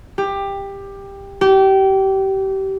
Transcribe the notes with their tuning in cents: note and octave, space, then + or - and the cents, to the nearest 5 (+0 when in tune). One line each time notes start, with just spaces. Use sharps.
G4 +15
G4 -25